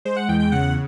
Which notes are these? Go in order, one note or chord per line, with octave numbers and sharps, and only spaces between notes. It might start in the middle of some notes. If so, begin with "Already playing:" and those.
G#3 C5
F#5
E2 G5
G5
C#3 F#5